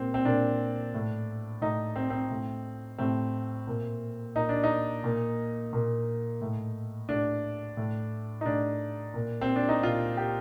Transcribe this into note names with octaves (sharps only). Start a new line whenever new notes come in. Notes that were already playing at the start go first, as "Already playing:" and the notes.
Already playing: A#2 C4
C4
A#2 D4
A2
A2 D#4
C4
C4
A2
A2 C4
A#2
A#2 D#4
D4
D#4
A#2
A#2
A2
A2 D4
A2
D#4
A2 D4
A#2
C4
D4
D#4
A#2 F4
G4